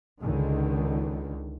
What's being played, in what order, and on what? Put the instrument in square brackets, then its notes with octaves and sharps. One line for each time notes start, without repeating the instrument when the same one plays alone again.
[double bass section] C#2 D3 D#3